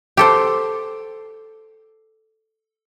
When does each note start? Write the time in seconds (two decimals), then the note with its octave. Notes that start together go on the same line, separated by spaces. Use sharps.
0.17 G4 A4 C5